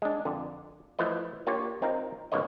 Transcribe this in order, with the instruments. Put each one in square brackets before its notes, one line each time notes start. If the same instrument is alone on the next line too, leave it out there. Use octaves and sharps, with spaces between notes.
[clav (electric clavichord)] G#3 D4
F2 D3
E3 F3 A3 B4 D#5
A#3 D4 F4 G4 C#5
C4 D#4 F4 A#4
G#1 G2 A#3 B4 C#5 D#5